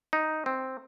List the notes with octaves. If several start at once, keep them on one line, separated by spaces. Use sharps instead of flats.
D#4
C4